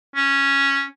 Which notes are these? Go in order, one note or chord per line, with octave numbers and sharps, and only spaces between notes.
C#4